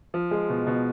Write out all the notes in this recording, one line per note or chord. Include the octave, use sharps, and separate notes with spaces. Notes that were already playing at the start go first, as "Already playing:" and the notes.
F3
G#3
B2
B2